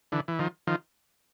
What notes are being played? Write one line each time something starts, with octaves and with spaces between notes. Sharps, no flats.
D3 E3
E3
D#3 F3
D#3 F3